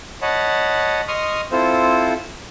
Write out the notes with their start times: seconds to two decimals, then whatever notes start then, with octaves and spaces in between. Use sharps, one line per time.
0.22 C#5 D#5 F#5 A5 B5
1.08 D#5 C6 C#6 D#6 F6
1.52 C4 E4 F4 A4 C5